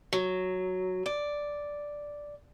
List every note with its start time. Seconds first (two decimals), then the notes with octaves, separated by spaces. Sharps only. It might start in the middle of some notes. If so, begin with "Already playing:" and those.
0.13 F#3
1.06 D5